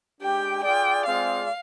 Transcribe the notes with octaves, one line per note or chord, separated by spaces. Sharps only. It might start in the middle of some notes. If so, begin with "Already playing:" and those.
G#3 D4 G4 G5
F4 G#4 D5 G5
G#3 C4 F4 G#4 D5 F5